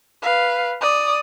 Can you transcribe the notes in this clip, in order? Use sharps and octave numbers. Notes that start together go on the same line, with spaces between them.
B4 F5
D5 D#6